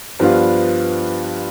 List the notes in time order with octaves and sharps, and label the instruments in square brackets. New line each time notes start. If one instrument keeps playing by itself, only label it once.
[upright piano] G2 F3 B3 D4 F4